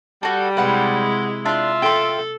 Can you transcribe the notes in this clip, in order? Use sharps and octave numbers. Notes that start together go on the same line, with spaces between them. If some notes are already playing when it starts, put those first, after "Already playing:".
G3 F#4 A4
C3 G#3 E4 B4 F#5
D4 F4 E5 C6
A4 G5 C6